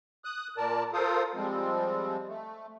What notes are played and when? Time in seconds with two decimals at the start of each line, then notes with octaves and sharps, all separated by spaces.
0.24 D#6 F#6
0.57 A#2 A#4 D5 A5
0.93 F4 A4 A#4 C5 F5 D#6
1.35 F3 G3 G#3 C4
2.28 A3